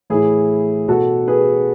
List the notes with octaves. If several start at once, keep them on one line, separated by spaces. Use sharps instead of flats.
A2 E3 E4 G#4
B2 F#4 A4
G#4 B4